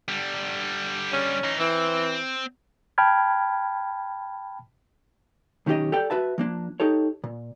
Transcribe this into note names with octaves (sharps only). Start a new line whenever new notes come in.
D3 G3
C#4
E3 D#4
E3 C4
G5 A5 B5 F6 G#6
B1 D#3 C#4 D#4 G4 D#5
G4 A4 D5 G5
F#4 B4 E5 A5
F3 A#3 D4
D#4 G4 A4 C#5
A#2